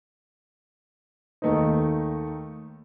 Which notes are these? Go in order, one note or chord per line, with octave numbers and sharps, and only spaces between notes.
D#2 D#3 A3 A#3 D#4